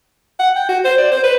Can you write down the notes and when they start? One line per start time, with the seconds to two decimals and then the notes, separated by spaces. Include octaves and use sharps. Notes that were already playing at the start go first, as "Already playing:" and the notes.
0.40 F#5
0.56 G5
0.69 F#4
0.85 C5
0.98 D5
1.12 C5
1.24 B4